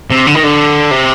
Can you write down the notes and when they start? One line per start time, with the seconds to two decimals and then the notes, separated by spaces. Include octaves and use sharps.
0.11 C3
0.27 D3
0.35 D#3
0.43 D3
0.91 C3